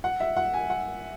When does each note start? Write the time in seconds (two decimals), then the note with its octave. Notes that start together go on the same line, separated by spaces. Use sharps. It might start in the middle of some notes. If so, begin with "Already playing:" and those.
0.04 F#5
0.20 E5
0.37 F#5
0.54 G#5
0.70 F#5